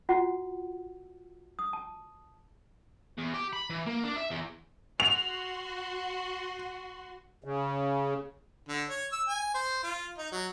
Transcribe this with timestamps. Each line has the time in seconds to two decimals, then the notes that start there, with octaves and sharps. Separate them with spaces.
0.09 F4 F#4 F#5
1.59 D#6
1.73 A5
3.18 E2
3.34 G4
3.53 B5
3.70 E3
3.86 A#3
4.04 D4
4.16 E5
4.31 E2
5.00 F#4 C6 F7
7.44 C#3
8.68 D3
8.89 C#5
9.12 E6
9.28 G#5
9.55 C5
9.83 F4
10.18 D#4
10.32 F#3